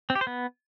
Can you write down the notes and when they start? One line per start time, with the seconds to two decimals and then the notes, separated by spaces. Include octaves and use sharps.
0.10 C4
0.15 G4
0.21 C5
0.27 B3